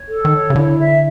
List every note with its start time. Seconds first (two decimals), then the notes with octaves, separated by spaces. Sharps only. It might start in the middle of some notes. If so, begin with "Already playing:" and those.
Already playing: C#5
0.09 A4
0.25 D#3
0.31 C#5
0.50 C#3
0.55 D3 E4
0.79 E5